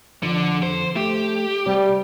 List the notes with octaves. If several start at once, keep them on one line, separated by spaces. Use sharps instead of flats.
F2 D3
C5
A3 G4
C3 G3